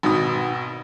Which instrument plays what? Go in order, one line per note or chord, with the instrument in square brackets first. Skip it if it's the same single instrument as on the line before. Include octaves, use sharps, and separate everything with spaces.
[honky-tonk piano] G#1 B2 D#6